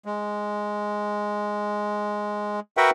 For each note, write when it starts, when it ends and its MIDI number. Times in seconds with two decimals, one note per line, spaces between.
0.05 2.60 56
2.77 2.90 66
2.77 2.90 70
2.77 2.90 71
2.77 2.90 76
2.77 2.90 78
2.77 2.90 79